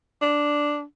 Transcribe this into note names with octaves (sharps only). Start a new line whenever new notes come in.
D4